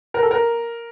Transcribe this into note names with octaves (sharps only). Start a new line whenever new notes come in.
A#4
A4
A#4